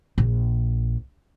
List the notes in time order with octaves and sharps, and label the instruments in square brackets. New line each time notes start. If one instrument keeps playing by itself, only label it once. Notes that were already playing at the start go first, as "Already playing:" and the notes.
[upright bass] A#1